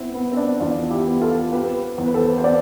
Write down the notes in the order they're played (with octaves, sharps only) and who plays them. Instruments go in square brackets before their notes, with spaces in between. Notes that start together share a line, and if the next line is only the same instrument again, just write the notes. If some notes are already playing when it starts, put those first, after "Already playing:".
Already playing: [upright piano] B3 C4 E4
B3
C4
D4
E2 D4 F4
E4 G4
B3
F4 A4
C4 G4 B4
E2 C5
B4
A4 C5
C5
C4 B4 D5